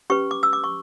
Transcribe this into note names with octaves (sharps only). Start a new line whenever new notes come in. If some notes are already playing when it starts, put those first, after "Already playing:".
C#4 G4 B4 C#6
D6
E6
D6
C#6